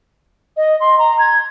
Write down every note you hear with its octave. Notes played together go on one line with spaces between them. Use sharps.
D#5
C6
A#5
G#6